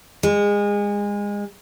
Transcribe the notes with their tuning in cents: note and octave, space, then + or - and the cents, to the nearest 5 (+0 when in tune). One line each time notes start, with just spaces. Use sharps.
G#3 -25